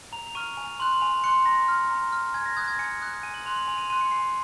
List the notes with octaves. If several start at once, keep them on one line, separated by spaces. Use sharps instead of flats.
A#5 F7
F7
C#6 F6 D#7
G#5 F7
C6 F#6 F#7
G#5 F7
C6 F#6 C#7
A#5 A#6
F6
A#5
F6
G#5 G#6
A#6
D#6 F#6 G#6
A#6
G#6
G#5 C#7
D#6 F#6
G#5 D#7
F#7
C6 F#6 F7
F#7
G#5 F7
D#7
C6 F#6 D#7
C#7
G#5 C7